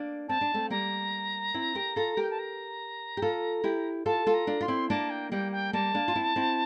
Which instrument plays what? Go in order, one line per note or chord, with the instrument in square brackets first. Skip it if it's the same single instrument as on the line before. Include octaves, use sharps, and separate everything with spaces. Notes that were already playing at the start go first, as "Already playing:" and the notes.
Already playing: [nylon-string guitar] A#3 D4
[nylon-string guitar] C4 [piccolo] A5
[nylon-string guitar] D4
A3 C4
[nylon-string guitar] G3 A#3 [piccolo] A#5
[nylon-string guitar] C4 E4
G4 A#4
F4 A4
[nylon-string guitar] G4 A#4 [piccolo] G5
[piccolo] A5
A#5
[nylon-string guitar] G4
F4 A4
E4 G4
[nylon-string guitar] F4 A4 [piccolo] A5
[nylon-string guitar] F4 A4
[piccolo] A#5
[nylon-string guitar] D4 F4
[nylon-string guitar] F4 [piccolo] C6
[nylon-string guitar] C4 E4
[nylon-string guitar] A#3 D4 [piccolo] A5
[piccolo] G5
[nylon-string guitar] G3 A#3 [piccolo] G5
[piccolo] G5
[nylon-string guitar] G3 A#3 [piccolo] A5
[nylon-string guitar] A#3 D4
F4
C4 E4
C4 E4